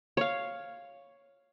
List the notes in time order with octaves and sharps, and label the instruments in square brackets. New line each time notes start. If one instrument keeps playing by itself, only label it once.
[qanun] C#5 F5